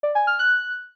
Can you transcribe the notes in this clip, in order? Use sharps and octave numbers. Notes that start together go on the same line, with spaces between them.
D5
G#5
F6
F#6